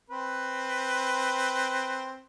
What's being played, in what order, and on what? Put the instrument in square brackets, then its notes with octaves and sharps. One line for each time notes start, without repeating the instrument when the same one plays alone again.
[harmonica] C4 B4